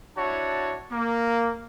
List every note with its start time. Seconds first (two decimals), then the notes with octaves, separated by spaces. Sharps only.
0.16 D4 E4 F#4 C#5 A5
0.91 A#3